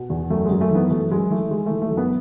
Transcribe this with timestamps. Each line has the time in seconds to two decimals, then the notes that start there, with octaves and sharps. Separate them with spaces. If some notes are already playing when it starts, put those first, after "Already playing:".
Already playing: B2
0.10 E2
0.30 F#2 A3
0.46 G#3
0.51 F#2
0.61 A3
0.71 E3 B3
0.90 F#2 A3
1.11 F#2 G#3
1.30 E3 A3
1.51 E3 G#3
1.66 E3 A3
1.82 A3
1.91 F#2
1.97 B3